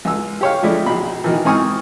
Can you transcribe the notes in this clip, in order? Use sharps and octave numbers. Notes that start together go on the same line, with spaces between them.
C#2 E6
G4 C#5 F5
F3 G#3 A3 D4 E4
A#1 B2 B5
B2 D#3 E3
G#2 C4 G#5 C#6 D#6 F6